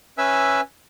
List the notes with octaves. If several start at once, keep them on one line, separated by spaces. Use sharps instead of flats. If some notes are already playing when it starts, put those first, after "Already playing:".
C#4 B4 E5 G#5 E6